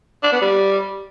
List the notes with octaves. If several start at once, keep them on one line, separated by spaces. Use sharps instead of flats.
D4
B3
G3